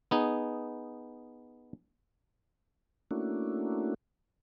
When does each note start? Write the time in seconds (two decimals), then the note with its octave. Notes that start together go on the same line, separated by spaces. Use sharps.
0.11 B3 D#4 G#4
3.11 A3 A#3 C#4 D4 E4 F#4